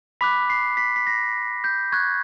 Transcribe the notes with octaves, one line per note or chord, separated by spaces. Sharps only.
B5 D6 F#6 B6
C7
B6
B6
A#6
G6
C#6 F#6 G#6